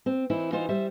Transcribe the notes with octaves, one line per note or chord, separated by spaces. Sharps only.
C4
E3 C4 D#4 E4
E3 D#4 F4 C5
G3 C5 E5